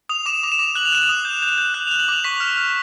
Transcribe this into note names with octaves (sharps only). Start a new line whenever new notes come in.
D#6 F7
D6 E7
D6
E7
D6
F#6 F#7
F7
F#6 E7
F7
D#6
G6
G6
G6
F#6
F#6 F7
F#7
D6 F7
C#6 B6
F6
F6